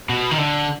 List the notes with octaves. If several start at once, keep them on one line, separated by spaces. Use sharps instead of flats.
B2
D#3
D3